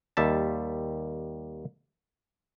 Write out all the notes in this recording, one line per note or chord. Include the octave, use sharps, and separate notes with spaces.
D#2 G3 E5 A5